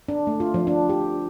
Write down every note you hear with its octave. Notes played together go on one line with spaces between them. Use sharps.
D4
A3
F4
F3
D4
G4